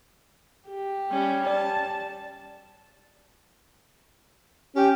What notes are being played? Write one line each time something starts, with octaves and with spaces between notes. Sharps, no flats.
G4
G3 C#4
D5 A5
C#4 G4